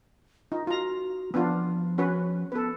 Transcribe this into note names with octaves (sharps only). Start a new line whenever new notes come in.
D#4 F4
F4 F#4 A#5
F3 B3 D4 F4
C#4 F#4 B4
B3 A4 B4